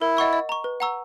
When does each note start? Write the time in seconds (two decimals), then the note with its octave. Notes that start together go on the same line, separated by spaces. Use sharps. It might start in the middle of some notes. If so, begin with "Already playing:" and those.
0.01 E4 A#4
0.17 D#5 F#5 C#6 E6
0.33 D#5
0.49 A#5 C#6
0.64 B4
0.80 F#5 A#5 C#6 E6